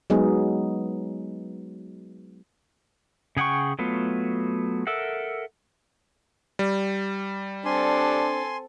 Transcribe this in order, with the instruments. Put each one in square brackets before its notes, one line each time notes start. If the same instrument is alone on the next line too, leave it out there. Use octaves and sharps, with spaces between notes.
[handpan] F#3 G#3 B3 D#4 G#4
[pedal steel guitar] C#3 G#4 F#5 G5 C#6
F#3 A3 B3 F4
A4 A#4 E5 F#5
[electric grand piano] G3
[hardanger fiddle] C4 A4 [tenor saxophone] D4 [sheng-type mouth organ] G#5 C6